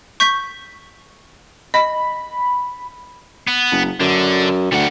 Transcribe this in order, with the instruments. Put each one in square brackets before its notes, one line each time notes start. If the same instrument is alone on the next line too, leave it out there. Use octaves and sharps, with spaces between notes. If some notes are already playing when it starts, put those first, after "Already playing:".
[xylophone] C#6 G6 B6
[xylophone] D#5 [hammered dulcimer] B5
[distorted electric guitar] B3
[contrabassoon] F#1
[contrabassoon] F#2 [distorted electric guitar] D3
[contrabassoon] D2 [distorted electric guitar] G3 F#5